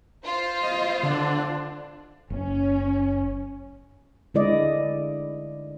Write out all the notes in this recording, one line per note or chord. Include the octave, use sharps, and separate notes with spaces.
F4 C5
D#5
D3 D4
F#1 C#4
D3 G#3 E4 D5 D#5